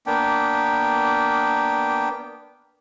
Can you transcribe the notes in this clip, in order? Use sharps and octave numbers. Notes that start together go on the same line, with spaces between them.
A#3 B3 D4 G5